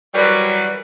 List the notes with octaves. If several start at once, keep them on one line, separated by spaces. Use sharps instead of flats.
E3 F#3 G3 A#4 B4